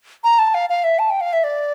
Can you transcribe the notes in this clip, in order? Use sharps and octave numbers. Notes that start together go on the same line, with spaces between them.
A#5
A5
F5
F5
E5
A5
G5
F5
E5
D5